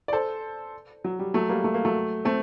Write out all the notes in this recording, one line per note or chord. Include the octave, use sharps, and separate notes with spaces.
D5
A4 C5
F#3
G3
F#3 A3
G3 A#3
A3
A#3
F#3 A3
A3 C4